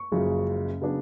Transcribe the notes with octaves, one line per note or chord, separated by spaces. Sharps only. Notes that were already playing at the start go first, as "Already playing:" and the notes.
Already playing: C#6
F#1 F#2 C#3 F3 G#3
C#3 F#3 B3 D4